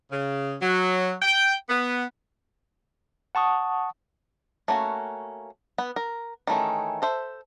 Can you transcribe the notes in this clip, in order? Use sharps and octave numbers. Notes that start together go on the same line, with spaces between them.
C#3
F#3
G5
B3
F#5 A5 C#6 D#6
A3 A#3 C#4 F#4
B3 B4
A#4
D#3 E3 A3 C#4 G#4
A4 C5 E5